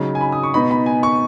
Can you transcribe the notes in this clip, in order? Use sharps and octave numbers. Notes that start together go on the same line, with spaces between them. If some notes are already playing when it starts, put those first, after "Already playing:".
Already playing: C#3 F#3 D#4
G#5
B5
D#6
C#6
B2 B3 D#4 B5
B5
G#5
C#6